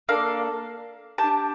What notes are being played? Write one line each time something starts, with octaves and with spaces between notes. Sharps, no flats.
A#3 D4 A4 F5
D4 G4 A5